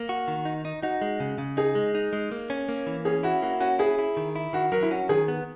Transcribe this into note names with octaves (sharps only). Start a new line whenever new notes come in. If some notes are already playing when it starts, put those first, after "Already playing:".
Already playing: A#3
F#4
D#3
D#4
D#4
D#4 F#4
G#3
C#3
C#3
D#4 G#4
G#3
D#4
G#3
A#3
C#4
A#3
E3
C#4 G#4
E4 F#4
A#3 F#4
C#4 F#4
E4 G#4
E4
D#3
E4
D#3 F#4
F#3 A#4
E4
C#4 F#4
D#3 G#4
B3